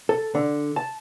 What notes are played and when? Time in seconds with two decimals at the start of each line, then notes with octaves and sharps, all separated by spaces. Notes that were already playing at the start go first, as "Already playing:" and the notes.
0.09 A4
0.35 D3
0.76 A5